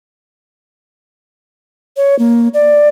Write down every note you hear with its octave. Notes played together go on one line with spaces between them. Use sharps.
C#5
A#3
D5